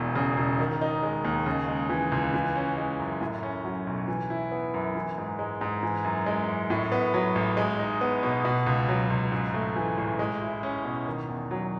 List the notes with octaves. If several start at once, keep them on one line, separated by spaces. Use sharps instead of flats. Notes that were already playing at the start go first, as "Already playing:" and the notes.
Already playing: E1 E2
C#3
E1
D#3
D#4
G#3
D#2
C#3
G#3
E3
C#2
E3
C#4
G#3
F#2
A2
C#4
F#3
B1
E3
E4
B3
F#2
E3
G#2
G#3
G#2
E3
F#2
G#3
F#2
A2
B3
F#3
A1
G#3
D#4
B3
B2
B2
C#2
F#3
C#2
G#2
A3
E3
A1
G#3
E4
C#4
B2
D#3
E2
F#3